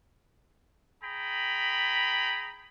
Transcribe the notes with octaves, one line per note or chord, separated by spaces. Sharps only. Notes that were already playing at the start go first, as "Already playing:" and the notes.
G#4 G5 A#5 B5